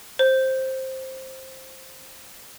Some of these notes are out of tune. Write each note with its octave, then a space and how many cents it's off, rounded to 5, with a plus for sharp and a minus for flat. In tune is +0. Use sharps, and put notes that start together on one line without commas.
C5 +10